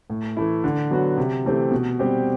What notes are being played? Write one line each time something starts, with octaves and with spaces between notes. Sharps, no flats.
A2
E3 A3 E4
D3
F#3 B3 F#4
C3
E3 A3 C4 G4
B2
G3 C4 G4